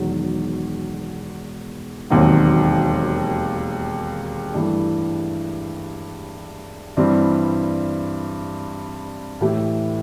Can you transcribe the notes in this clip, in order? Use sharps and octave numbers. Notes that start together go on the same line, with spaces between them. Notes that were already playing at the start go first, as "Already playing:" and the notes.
Already playing: E1 E2 D#3 F#3
E1 D#2 D#3 F#3 C4
G2 E3 A3
G2 E3 G3 C4
A2 E3 A3 E4 G4